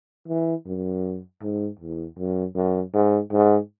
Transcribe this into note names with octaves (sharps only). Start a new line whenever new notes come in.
E3
F#2
G#2
E2
F#2
F#2
G#2
G#2